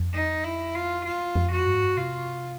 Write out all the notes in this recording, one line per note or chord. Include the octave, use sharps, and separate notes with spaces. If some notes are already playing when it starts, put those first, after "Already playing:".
Already playing: F2
D#4
E4
F4
F4
F2
F#4
G2
G#2
G2
C3 F4